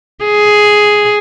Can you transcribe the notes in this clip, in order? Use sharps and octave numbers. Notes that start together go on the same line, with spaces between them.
G#4